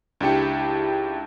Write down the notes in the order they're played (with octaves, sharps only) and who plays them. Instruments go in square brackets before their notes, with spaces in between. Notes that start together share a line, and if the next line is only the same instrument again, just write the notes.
[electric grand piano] C#2 D4 E4 G4 G5 C#7